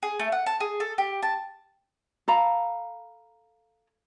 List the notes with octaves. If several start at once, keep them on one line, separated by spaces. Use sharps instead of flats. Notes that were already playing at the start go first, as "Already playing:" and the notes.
G#4
A3
F#5
A5
G#4
A4
G4
A5
A4 F5 A#5 B5